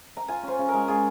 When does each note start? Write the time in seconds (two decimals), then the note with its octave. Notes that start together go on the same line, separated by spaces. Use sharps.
0.17 A#5
0.28 F4 G#5
0.43 C#4 C5
0.59 C#3
0.69 A#4
0.74 G#3
0.88 F4 G#4